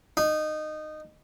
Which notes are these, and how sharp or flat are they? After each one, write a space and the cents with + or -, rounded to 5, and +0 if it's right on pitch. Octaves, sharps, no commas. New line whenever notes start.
D#4 -15